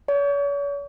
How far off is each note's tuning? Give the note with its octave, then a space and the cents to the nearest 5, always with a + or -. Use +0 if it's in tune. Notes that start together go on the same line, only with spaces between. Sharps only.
C#5 +40